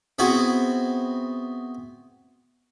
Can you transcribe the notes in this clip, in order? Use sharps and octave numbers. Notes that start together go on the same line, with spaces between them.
B3 C4 E4 F#4 G#4